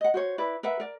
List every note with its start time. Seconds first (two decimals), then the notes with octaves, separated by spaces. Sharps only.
0.01 D#5 F#5
0.14 F#4 C5 C#5
0.38 E4 B4 D5
0.63 A#4 B4 E5 F#5
0.80 A#4 D5